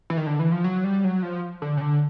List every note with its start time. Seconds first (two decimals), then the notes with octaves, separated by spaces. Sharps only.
0.10 E3
0.17 D#3
0.27 D3
0.39 E3
0.52 F3
0.64 F#3
0.84 G3
1.04 F#3
1.23 F3
1.62 D3
1.77 C#3
1.81 D3